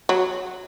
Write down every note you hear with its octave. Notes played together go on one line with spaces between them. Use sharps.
F#3